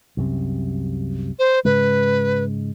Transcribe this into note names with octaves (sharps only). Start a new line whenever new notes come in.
C2 F#2 C3
C5
G#2 C#3 G#3 B4